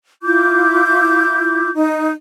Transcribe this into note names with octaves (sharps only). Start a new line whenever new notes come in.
E4 F4 D6 G6
D#4